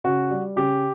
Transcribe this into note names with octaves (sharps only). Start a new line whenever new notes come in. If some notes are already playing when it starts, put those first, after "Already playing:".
C#3 F#4
G3
C#3 G4